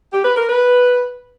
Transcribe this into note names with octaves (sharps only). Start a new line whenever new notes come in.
G4
B4
A#4
B4